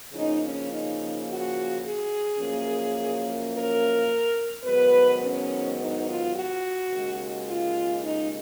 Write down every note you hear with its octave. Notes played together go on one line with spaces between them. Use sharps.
C#3 F3 A#3 C#4 D#4
C#4
D#4
F#4
G#4
F#2 F3 A#3 C#4
A#4
G#2 D#3 F#3 B3 B4
C#4
D#4
F4
F#4
D#2 C#3 G#3
F4
D#4